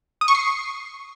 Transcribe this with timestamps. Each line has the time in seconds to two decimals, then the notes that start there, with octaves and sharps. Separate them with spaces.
0.21 D#6
0.28 C#6
0.35 C7